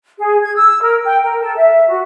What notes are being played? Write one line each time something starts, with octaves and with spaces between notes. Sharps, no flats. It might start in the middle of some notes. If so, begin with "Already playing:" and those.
G#4
G#6
E6
A#4
G5
A#4
A4
E5
F#4